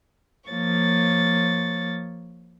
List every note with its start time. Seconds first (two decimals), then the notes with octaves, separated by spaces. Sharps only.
0.48 F3 A#3 C#5 A6